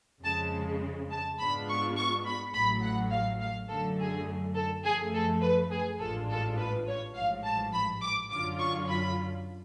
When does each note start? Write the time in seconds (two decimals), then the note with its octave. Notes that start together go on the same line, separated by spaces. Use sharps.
0.24 F2 C#3 G#3 A5
1.11 A5
1.39 G#2 G#3 B3 D4 F4 B5
1.69 C#6
1.97 C#6
2.26 B5
2.54 A1 A2 F#3 B5
2.84 F#5
3.12 F5
3.42 F5
3.69 F#2 D3 F#3 A3 A4
3.99 G#4
4.56 A4
4.85 F#2 F3 A3 G#4
5.14 A4
5.42 B4
5.72 G#4
6.01 A1 G#2 G#3 D4 F4 A4
6.30 A4
6.58 B4
6.87 C#5
7.16 A1 G#2 F3 F5
7.45 A5
7.73 B5
8.03 D6
8.31 F#2 D3 F#3 C#4 F4 D6
8.60 C#6
8.89 B5